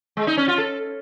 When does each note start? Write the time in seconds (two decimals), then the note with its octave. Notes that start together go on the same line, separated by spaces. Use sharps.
0.17 G#3
0.27 D#4
0.37 C#4
0.48 F4
0.58 A4